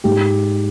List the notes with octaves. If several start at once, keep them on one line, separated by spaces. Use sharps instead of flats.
G#2 G4